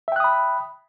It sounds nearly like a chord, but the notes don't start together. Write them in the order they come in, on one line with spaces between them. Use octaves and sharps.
E5 G5 F#6 D#6 B5